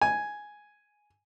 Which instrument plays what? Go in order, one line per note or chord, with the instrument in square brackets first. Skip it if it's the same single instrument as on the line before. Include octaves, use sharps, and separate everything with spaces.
[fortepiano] G#5